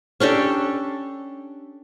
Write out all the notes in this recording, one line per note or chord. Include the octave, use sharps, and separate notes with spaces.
C#4 D4 G4 A4